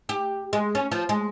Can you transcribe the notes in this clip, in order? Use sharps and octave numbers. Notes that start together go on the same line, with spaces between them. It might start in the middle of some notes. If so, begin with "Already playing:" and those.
G4
G#3
C#4
F3
G#3